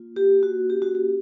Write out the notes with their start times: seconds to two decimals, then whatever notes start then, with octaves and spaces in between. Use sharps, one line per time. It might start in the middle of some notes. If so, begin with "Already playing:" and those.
Already playing: A#3 F4
0.16 G4
0.29 A#3
0.43 F#4
0.70 C#4 G4
0.82 F#4
0.95 G4